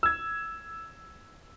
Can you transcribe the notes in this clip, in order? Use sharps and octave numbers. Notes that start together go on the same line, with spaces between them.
E6 G#6